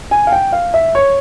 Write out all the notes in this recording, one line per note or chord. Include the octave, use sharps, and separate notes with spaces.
G#5
F5
G5
F5
E5
C#5